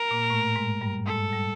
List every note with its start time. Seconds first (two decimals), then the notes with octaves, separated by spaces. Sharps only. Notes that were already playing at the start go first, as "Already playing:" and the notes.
Already playing: A#4
0.11 A#2 A#3
0.30 A2 A3
0.56 G#2 G#3
0.81 G2 G3
1.07 G#2 G#3 A4
1.32 G3